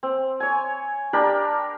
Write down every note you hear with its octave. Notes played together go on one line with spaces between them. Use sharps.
C4
C#5 G#5
D4 G4 A#4 B5